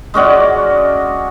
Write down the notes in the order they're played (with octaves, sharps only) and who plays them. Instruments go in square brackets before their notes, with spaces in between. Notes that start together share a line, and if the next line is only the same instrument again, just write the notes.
[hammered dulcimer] G#3 C#4 F#4 D5